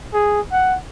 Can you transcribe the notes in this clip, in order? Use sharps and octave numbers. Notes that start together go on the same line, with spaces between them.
G#4
F#5